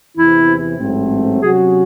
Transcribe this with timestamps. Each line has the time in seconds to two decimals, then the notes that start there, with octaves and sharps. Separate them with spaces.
0.17 E2 C3 E3 E4
0.79 A1 G#2 F#3 A3 C4
1.42 C3 F#3 C#4 F#4 G#4